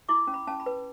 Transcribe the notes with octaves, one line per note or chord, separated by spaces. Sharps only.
E4 D6
C#4
B5
C#4 A5
B5
B4